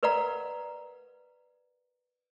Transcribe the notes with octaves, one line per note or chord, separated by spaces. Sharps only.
A#4 B4 D5 F5 F#5 A#5